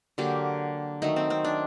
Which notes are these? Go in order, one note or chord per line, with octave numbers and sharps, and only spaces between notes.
D3 F#3 A#3 G4
D#3 F#3 A3 D#4
C4
C4
D4